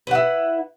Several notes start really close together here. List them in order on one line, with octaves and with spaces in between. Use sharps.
B4 F#5 E4